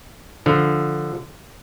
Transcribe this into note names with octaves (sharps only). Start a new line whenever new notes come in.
D3 F3